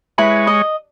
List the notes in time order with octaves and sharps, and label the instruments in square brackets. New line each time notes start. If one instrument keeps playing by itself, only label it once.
[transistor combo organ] G#3 C#5 [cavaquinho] E4 B4 B5
[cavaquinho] D#5